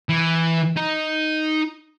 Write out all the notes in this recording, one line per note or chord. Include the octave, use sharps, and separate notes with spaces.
E3
D#4